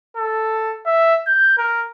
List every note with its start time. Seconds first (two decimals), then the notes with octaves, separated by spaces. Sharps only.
0.17 A4
0.87 E5
1.27 G6
1.58 A#4